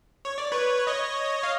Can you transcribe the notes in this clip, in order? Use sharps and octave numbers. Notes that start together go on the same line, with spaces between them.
C#5
D5
B4 C#5
C#5 D#5
F5